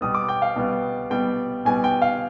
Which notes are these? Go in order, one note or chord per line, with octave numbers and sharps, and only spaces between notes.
B2 G3 B3 D#6
D6
G5
F5
B2 G3 B3
B2 G3 B3 G5
B2 G3 B3 G#5
G5
F5